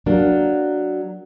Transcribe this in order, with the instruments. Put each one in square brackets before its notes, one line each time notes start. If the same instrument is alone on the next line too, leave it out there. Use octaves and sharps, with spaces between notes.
[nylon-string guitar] F#3 A#3 D4